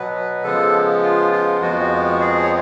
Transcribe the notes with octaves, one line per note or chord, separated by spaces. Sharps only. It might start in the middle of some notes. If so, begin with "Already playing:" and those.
Already playing: B2 F#3 B3 B4
C#3 F3 G#3 B3 A4
F4
F4
F2 F3 G#3 B3 F#4
G#4
C#5